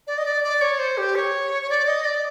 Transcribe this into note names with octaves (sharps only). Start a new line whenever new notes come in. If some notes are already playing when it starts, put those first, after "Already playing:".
D5
D#5
D5
D5
C#5
C5
G4
C#5
C#5
D5
D#5
D5